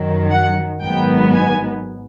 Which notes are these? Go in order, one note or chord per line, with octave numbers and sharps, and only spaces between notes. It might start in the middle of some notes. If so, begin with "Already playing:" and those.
Already playing: F#2 D#3 F#3
F#5
G#1 G#2 D#3 F#3 B3 G5
G#5